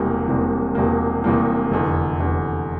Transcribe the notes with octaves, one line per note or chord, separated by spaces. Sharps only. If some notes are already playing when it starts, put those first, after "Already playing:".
Already playing: E1 E2 C3 G3 A#3
E1 E2 C3 G3 A#3
E1 E2 C3 G3 A#3
E1 E2 C3 G3 A#3
F1 E2 D3
F1 E2 D3